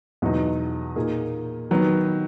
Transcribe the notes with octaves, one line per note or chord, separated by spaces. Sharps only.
E2 B2 F#3 B3 D#4
A#2 A#3 D#4 G#4
D#3 F#3 B3